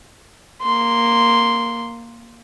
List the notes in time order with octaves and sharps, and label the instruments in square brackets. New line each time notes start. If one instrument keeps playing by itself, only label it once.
[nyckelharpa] A#3 C6